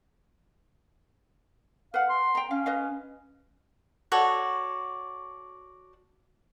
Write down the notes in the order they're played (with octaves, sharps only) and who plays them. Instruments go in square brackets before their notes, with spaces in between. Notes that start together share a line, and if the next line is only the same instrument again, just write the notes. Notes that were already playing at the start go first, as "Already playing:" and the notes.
[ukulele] B4 F#5 [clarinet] F5
[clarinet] C6
[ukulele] G5 A#5
[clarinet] C#4 [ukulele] F5
[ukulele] B4 D#5 F5
[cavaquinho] F#4 A4 C#5 D5